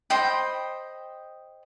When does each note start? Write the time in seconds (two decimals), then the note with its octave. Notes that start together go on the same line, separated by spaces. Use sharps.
0.10 C5 D#5 G5 B5